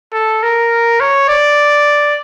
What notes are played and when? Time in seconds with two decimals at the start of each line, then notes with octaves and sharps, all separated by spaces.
0.13 A4
0.43 A#4
1.00 C#5
1.29 D5